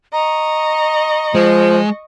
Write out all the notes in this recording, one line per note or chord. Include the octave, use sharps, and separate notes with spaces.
D#5 A#5 C#6
F3 G#3